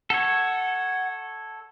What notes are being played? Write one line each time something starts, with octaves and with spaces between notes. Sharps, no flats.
A4 C#5 F#5